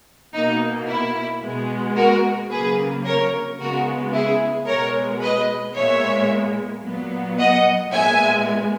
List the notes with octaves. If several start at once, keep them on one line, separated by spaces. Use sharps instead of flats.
B2 A#3 D#4
E4
B2 G#3 B3
F#4 A#4
C#3 F#3 A#3 G#4 B4
A#4 C#5
C#3 G#3 B3 F#4 A#4
E4 G#4
B2 G#3 B3 A#4 C#5
B4 D#5
A#2 G#3 B3 C#5 E5
A#2 F#3 B3
D#5 F#5
A#2 G#3 B3 E5 G#5